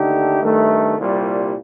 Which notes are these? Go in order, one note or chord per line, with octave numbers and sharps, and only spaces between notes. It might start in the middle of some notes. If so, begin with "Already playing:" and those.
Already playing: D#2 D3 A3 D#4 G4
G2 D#3 A3
C2 A#2 G3